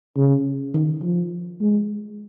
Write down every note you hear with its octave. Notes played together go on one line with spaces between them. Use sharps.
C#3
D#3
F3
G#3